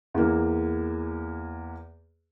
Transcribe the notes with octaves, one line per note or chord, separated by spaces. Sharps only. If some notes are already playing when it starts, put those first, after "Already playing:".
E2 A#3